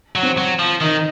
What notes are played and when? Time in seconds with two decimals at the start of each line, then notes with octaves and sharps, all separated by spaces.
0.15 F#3
0.23 C4
0.38 F#3
0.59 F3
0.81 D#3 D#4